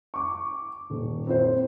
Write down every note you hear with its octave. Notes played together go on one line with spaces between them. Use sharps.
C#6 D6
D#1
C4 E4 C5